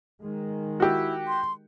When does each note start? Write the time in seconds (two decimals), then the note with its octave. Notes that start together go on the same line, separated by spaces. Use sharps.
0.23 D#3 G#3
0.80 E4 F#4 G4
1.28 C6